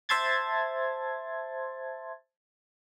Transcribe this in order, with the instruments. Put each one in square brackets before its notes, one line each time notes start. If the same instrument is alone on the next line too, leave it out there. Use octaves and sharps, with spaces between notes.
[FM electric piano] C5 E5 A5 C6 G#6 A6